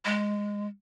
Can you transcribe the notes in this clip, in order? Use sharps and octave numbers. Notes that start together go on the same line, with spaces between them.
G#3